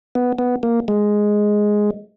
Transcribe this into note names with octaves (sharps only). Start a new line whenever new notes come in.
B3
B3
A#3
G#3